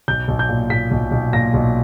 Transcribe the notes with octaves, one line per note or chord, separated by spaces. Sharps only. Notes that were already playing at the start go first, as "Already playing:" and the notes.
B1 G6
B1
G6
A#2
A#2 B6
B1
B1
A#2 A#6
B1